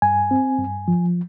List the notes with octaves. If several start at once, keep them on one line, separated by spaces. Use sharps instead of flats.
G2 G#5
C4
G2
F3